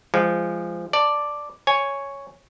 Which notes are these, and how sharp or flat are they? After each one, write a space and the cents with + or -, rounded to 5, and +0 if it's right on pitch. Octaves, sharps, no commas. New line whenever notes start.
F3 -20 G#3 -15
D5 +0 A5 +10
C#5 +5 G#5 +0